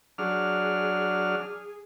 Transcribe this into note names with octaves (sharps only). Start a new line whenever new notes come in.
F#3 D4 G#4 F6